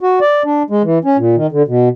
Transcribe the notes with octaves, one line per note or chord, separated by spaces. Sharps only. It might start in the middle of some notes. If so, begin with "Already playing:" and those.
F#4
D5
D4
G#3
E3
C#4
A#2
D#3
D3
B2